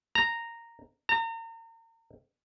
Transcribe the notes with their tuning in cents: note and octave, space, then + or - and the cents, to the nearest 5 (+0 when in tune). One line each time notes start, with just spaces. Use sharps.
A#5 -5
A#5 -35